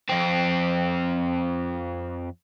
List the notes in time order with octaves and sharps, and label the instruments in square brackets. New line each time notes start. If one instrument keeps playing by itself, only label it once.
[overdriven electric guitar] F2 C4